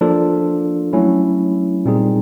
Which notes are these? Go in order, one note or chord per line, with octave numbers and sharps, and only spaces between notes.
F3 A#3 D4 F4 A4
F#3 A3 C#4 E4
A#2 G3 C4 D#4 G#4